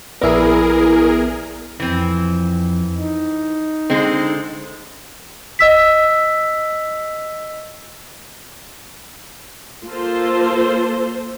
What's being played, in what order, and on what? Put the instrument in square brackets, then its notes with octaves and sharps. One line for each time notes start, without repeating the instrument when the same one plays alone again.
[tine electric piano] A#1 D5 [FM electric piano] B3 E4 [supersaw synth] G#4 A#4
[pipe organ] F2 [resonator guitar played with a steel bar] E3 C4
[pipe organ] D#4
[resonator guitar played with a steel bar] D3 G#3 C4
[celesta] D#5 E6 B6
[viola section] A#3 F4 A4 C5